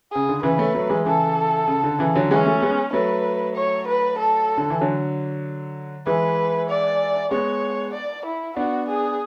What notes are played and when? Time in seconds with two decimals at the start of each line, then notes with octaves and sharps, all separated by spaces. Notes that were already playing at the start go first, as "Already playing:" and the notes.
0.11 C#3 G#4
0.29 D3
0.43 C#3 E3 B4
0.58 A3 C#4
0.75 F#3 A3
0.89 E3 G#3
1.05 C#3 E3 A4
1.68 C#3
1.84 D3
1.99 C#3 E3
2.15 D3 F#3
2.31 E3 G#3 C#4
2.46 F#3 A3
2.61 G#3 B3
2.93 F#3 A3 B4
3.55 C#5
3.87 B4
4.18 A4
4.57 D3
4.70 E3
4.81 D3 F#3
6.06 E3 G#3 B4
6.69 D5
7.31 G#3 B3 C#5
7.94 D5
8.25 E4
8.56 B3 D4 F#4
8.89 G#4